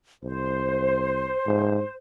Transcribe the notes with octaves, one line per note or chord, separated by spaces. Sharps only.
C2 C5
G#2